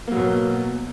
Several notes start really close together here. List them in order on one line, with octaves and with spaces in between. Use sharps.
A#3 F#3 B2